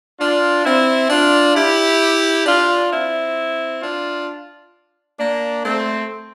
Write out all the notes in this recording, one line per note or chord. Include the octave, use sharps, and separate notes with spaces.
D4 F4
C4 E4
D4 F4
E4 G4
D4 F4
C4 E4
D4 F4
A#3 D4
A3 C4